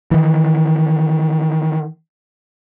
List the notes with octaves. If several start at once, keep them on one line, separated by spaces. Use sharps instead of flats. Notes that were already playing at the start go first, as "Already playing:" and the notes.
D#3 E3